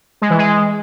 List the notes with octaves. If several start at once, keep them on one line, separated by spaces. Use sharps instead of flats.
G#3
E3
G#3